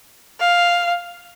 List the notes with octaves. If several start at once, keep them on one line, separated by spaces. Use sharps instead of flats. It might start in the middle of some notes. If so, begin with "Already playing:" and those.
F5